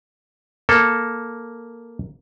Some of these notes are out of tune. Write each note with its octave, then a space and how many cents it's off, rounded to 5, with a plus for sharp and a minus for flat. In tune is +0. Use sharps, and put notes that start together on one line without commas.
A#3 +0 A4 +0